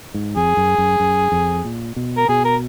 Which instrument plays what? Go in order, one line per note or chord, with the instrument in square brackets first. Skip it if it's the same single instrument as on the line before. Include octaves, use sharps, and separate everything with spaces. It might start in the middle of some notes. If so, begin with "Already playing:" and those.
[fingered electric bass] G#2
[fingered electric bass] F2 [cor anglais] G#4
[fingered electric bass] F#2
F#2
F#2
F2
A#2
B2
[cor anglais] A#4
[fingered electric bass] B2 [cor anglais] G#4
[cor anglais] A#4